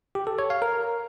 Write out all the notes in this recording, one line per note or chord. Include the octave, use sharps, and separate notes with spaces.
G4
A4
C#5
F5
A#4